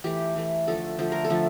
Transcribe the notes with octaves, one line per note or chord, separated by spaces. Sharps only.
E3 A3 G4
E3 A3
D3 F3 A3 A4
D3 F3 A3 C5
A#4
A4
D3 F3 A3